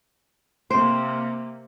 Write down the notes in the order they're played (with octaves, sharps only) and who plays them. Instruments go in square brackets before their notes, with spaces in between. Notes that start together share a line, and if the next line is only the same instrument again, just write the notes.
[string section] C3 A#3 [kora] C5